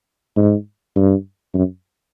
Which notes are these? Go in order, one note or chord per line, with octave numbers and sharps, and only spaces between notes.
G#2
G2
F#2